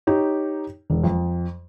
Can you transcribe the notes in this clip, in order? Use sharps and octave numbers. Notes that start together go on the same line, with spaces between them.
D#4 G4 C#5
E1
F2